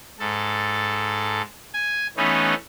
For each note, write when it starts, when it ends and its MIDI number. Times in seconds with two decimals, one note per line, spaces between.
0.19 1.42 44
0.19 1.42 69
1.74 2.07 80
2.17 2.54 52
2.17 2.54 57
2.17 2.54 59
2.17 2.54 61
2.17 2.54 63